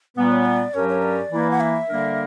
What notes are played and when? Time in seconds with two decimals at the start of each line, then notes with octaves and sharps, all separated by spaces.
0.16 A#2 G3 B3 B4
0.31 C#5
0.46 D5
0.74 G2 F#3 C#4 G4 A#4 C#5
0.89 C#5
1.02 D5
1.31 E3 A#3 E4 B4
1.51 F#5
1.60 E5
1.88 D3 G3 A#3 D4 A#4